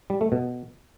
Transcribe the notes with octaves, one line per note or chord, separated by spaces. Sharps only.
G3
A3
B2